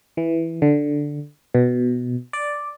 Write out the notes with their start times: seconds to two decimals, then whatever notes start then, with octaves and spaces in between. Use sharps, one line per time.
0.17 E3
0.62 D3
1.54 B2
2.33 D5